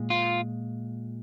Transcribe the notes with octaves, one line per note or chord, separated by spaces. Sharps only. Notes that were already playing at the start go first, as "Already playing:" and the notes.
Already playing: A#2 G#3
F4